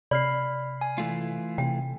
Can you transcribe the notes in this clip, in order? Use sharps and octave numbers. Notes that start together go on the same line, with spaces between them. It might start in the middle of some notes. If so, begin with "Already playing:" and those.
C3 D5 B5 F6 C7
G#5
E3 A3 F4
C3 G5